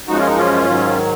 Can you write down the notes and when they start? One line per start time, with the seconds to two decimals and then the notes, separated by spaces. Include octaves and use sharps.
0.08 F#2 F3 G#3 D#4 F#4
0.17 C#4 F4
0.27 D#4
0.36 C#4 F4
0.66 G#2 D#3 F#3